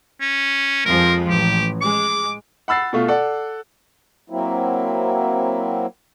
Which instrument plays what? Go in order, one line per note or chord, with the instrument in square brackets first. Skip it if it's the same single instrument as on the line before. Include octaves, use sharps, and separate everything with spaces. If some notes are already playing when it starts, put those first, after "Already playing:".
[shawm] C#4
[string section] F2 F3 G#3 [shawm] A#4
[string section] A1 [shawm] G4
[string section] G#3 [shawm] D6
[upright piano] F#5 B5 E6 A6 C7
B2 A3 F4
A4 D5 F#5
[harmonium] F#3 A#3 C4 E4